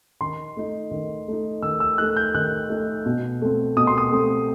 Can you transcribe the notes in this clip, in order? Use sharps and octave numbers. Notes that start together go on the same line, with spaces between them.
D#3 C6
A3 D#4
D#3
A3 D#4
D#3 E6
E6
A3 D#4 F#6
G6
D#3 F#6
A3 D#4
B2
A3 C4
B2 D#6
C6
D#6
A3 C4